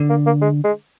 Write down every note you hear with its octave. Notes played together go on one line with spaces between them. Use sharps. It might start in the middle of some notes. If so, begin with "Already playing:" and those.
Already playing: D3
A#3
A#3
G#3
G#3